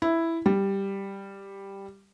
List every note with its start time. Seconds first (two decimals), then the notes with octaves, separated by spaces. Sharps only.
0.02 E4
0.46 G3